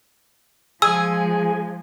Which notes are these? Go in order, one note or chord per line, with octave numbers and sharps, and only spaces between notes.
F3 G#3 G#4 G#5 E6